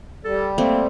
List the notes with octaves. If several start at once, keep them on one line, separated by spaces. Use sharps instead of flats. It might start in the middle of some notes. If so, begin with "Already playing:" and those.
G3 A4
A3 A#3 C4